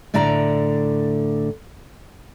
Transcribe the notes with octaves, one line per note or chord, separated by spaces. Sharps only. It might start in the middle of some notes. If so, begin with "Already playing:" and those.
A2 D3 D5 F#5 A#5